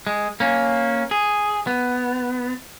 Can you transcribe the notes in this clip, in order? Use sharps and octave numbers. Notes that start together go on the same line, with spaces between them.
G#3
A#3 C#4
G#4
B3